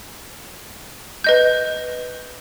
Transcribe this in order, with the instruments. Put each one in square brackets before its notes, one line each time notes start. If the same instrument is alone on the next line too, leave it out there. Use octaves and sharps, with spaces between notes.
[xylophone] B4 D#5 G6